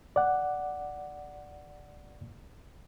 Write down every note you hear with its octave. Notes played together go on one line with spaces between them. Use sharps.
D5 F#5